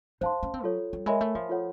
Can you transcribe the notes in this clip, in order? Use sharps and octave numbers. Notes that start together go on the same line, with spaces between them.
D#4 C5 F5 A5 C6
C#4
C4
F#3 F4 A4 C#5
G3
G#3 A#4 C#5 E5 G#5 B5
A3
F3
F4 A4 C#5 F#5